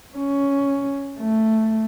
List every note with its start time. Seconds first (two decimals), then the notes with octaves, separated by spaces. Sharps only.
0.16 C#4
1.20 A3